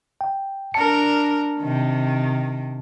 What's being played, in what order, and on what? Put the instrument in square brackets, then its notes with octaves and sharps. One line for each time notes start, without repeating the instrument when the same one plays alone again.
[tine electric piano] G5
[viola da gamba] D4 A#4 [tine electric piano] A5 C#7
[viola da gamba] C3 D#3